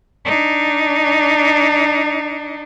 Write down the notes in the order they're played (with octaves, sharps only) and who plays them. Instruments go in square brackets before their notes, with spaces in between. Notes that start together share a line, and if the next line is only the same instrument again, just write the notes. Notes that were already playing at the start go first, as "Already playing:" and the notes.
[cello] D4 D#4